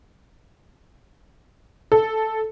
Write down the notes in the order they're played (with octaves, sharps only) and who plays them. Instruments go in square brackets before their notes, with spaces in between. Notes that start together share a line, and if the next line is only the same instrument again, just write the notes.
[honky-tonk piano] A4